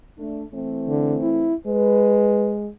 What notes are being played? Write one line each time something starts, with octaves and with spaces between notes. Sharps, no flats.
A3 D4
E3 A3 C4
D3
E4
G#3 B4